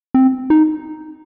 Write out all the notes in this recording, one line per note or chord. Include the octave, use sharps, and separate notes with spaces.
C4
D#4